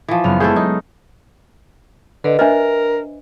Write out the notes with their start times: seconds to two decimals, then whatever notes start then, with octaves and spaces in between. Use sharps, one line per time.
0.08 E3 F3
0.24 F#1 B3 F6
0.40 G#3 A3 B3 E4 G#4 A4 G6
0.56 D#4
2.24 D3 B4 D#5
2.39 D4 A#4 C5 D#5 E5 F6